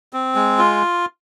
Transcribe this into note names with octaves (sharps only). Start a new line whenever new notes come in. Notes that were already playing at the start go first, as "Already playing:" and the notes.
C4
G#3
F4